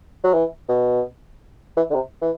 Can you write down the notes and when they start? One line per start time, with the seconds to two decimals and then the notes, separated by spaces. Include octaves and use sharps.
0.24 F#3
0.33 E3
0.69 B2
1.77 E3
1.90 D3
1.94 C3
2.21 E3